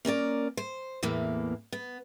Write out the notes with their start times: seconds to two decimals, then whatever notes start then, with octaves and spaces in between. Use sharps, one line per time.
0.05 A#3 C#4 A#4 D5
0.57 C5
1.03 E2 A2 E3 A#3
1.72 B3